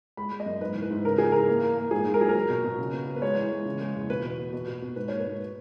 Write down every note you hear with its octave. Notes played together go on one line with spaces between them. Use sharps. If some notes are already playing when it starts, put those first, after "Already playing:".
G#3 B5
G#3
D#5
F#2
G#2 B4
E3
B4
G#2
C#3 A#4
B3 G#4
E3 A#4
A#3
A#3
A#3
G#2 G#4
G#2
A#4
F#3 G#4
A#4
F#3
B2
B2
C#3
B3
B3
B4
G#3 C#5
E3
G#3
C#3
G#3
E2
B2 B4
B2
B3
B2
B2
B2
G#2 B4
A#3 C#5
B4
G#2